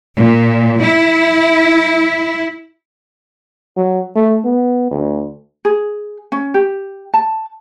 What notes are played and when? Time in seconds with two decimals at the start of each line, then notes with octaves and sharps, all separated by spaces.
0.17 A#2
0.82 E4
3.77 F#3
4.15 A3
4.44 B3
4.91 D2
5.65 G#4
6.32 C#4
6.54 G4
7.14 A5